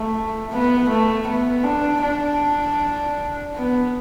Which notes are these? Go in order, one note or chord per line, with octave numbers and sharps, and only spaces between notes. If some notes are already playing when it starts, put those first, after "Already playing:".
Already playing: A3
B3
A3
B3
D4
D4
B3